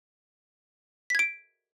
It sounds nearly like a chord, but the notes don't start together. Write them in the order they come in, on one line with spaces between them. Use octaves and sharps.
B6 G#6 D7